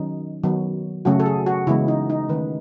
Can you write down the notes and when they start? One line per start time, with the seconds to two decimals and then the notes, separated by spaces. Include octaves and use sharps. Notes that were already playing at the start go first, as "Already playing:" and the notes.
Already playing: D#3 F#3 C#4 D#4
0.43 D#3 F#3 B3
1.05 C#3 F#3 A3 C#4 F#4
1.20 A4
1.26 G#4
1.46 F#4
1.67 C#3 E3 G#3 B3 E4
1.88 D#4
2.10 D#4
2.29 D#3 A3 C#4 B4